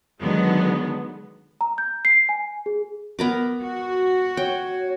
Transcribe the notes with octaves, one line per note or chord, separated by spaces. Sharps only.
D3 D#3 F#3 G#3 B3
A#5
G6
C7
G#5
G#4
B3 A#4 D6
F#4
C#5 G5